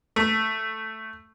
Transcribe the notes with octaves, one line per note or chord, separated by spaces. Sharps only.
A3